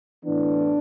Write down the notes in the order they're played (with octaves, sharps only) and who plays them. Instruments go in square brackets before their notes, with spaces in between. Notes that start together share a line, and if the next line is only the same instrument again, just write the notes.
[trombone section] A2 E3 B3 D4